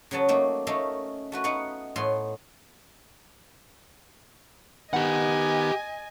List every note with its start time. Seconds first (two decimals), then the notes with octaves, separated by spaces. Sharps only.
0.11 C#3 F#3 B3 A5
0.28 A3 A#3 D#4
0.67 A3 C#4 D#4 A#4 E5 F5
1.32 A3 F#4 B4
1.44 B3 D#4 B4 F5 F#5
1.96 A2 B3 C6
4.93 D#3 B3 G4 D#5 F#5 G#5